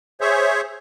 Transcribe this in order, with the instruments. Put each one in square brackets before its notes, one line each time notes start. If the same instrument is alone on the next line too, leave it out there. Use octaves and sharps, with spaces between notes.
[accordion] G#4 C5 C#5 E5